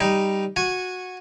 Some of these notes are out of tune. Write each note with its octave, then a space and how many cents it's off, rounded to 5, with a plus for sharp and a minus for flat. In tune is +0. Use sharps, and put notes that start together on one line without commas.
G3 +0 D#4 +0
F#4 -15 G#5 +0